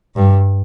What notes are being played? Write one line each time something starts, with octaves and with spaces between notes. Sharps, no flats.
G2